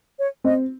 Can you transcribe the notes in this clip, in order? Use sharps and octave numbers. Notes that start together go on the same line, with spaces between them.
C#5
C4 D#5